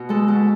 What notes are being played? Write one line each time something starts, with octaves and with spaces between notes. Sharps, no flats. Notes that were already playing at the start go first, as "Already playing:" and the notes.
Already playing: B2 B3 F#4
G#3 A4
B2